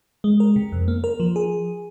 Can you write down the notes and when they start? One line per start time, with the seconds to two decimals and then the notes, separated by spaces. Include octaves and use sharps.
0.24 G#3
0.40 A#4
0.56 C3
0.72 F2
0.88 A#3
1.04 A#4
1.20 F3
1.36 G#4